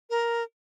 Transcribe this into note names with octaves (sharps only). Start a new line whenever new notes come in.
A#4